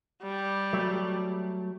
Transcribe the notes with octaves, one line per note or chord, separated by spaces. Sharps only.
G3
F#3 A3